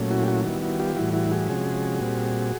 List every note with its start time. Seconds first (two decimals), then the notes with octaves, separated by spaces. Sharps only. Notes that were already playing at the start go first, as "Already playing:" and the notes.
Already playing: A#2 F#3 A3 C#4
0.11 E4 F#4
0.23 G4
0.28 E4 F#4
0.45 D#3 G3 B3 E4 F#4
0.62 E4 F#4
0.80 F4 G4
0.96 A2 E3 G3 E4 F#4
1.13 E4 F#4
1.31 F#4 G#4
1.48 C3 F3 G#3 C#4
2.01 A#2 G3 C4